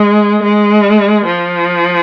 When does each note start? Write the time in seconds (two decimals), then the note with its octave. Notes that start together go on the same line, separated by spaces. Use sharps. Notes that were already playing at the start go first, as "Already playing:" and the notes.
Already playing: G#3
0.43 G#3
1.26 F3